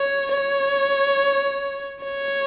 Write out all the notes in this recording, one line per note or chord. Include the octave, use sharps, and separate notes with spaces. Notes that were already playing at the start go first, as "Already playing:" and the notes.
Already playing: C#5
C#5
C#5